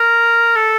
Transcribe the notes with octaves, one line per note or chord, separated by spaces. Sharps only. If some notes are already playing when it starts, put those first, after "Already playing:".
Already playing: A#4
A4